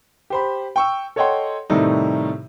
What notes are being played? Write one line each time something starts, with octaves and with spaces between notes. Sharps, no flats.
G4 C5 B5
G5 C#6 E6
A4 C#5 D#5 F#5 G5 C6
A2 C3 D#3 G3 A3 D#4